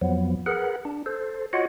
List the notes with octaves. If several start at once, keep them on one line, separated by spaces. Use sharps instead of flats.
F2 F3 F#3 B3
G#4 A#4 B4 F#5
D4
A4 C5
F4 F#4 C#5 D#5 F#5